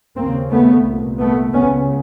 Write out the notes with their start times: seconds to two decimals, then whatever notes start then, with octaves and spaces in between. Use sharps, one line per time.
0.17 D#2 C#3 A#3 C4
0.51 A3 B3
0.85 C2 A#2
1.19 A3 B3
1.53 C#2 C#3 B3 C#4